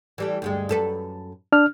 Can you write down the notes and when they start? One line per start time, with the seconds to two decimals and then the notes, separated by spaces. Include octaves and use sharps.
0.18 E3 G3 A3
0.42 D2 G2 G#3
0.69 F#2 A4 B4
1.52 D4 F6